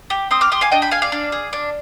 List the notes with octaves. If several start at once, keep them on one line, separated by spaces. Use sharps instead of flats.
G4
C4 C6 D#6
D6 F6
G4 C6 D#6
F5 G#5
D4 D#5 G5
G5 B5
G#4 F5 G#5
D5 F5
D4
G#4
D4